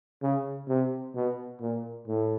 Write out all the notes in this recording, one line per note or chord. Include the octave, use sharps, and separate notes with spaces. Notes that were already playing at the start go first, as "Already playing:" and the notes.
C#3
C3
B2
A#2
A2